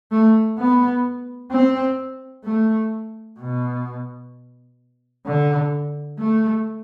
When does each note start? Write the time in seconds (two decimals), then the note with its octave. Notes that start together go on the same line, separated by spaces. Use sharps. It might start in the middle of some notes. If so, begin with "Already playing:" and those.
0.11 A3
0.58 B3
1.51 C4
2.44 A3
3.39 B2
5.26 D3
6.19 A3